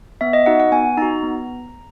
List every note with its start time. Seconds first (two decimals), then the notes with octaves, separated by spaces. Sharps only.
0.21 B3 E5
0.33 D#5
0.46 D#4 F#4 F#5
0.60 F#5
0.72 B3 G#5
0.97 D#4 F#4 A#5
1.23 B3